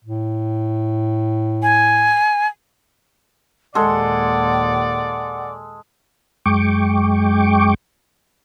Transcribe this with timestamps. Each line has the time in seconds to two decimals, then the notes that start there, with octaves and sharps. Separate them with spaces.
0.04 A2
1.63 G#5
3.75 D#2 A#2 G#3 A4 D5 F#5
6.46 F#2 G#3 G5 C#6 D6